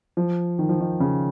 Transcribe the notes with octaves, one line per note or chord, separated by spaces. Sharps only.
F3
D#3
F3
D#3
C#3